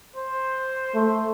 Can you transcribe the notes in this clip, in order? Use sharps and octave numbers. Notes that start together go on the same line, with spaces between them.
C5
A3